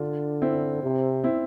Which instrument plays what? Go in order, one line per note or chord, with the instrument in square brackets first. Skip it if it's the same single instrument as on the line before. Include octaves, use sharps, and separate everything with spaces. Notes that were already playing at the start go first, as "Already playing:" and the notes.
Already playing: [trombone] D3 [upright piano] D4 F4
[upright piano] C4 E4
[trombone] C3
[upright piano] C4 E4